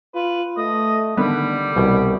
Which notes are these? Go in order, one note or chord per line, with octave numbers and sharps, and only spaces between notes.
F4 B4
A3 D#5
D3 D#3 G3 B3 B4
C2 B2 B4 G5